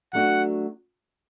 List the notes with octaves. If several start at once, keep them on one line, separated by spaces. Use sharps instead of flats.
F#3 A3 D4 F#4 F#5